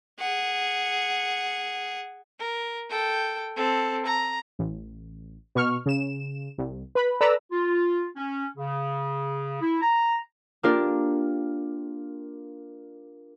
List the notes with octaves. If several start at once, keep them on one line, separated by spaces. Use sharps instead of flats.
G#4 F#5
A#4
A4 G5
C4 A4
A#5
A1
B2 C#6 F6
C#3 E7
C2
B4 B5
A4 B4 D5 A#5 B5 E6
F4
C#4
C#3
E4
A#5
A#3 D4 F4 G4 A#4 D5